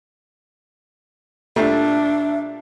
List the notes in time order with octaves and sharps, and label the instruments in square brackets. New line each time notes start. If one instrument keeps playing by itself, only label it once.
[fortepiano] A#2 G3 A3 [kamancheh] D4 [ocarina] E5